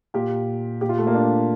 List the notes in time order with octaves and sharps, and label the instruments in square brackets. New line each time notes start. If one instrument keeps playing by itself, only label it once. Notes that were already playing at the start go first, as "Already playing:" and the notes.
[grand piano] A#2 G4
A#2 G4
F4
A3
A#3
D4